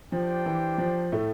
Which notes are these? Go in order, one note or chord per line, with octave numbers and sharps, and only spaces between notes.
F3 D4 G4 C5 G5
E3
F3
A2 A3